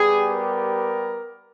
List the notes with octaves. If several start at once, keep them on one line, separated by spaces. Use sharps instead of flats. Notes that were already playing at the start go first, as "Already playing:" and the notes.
Already playing: G3 B3 G4 G#4
A#4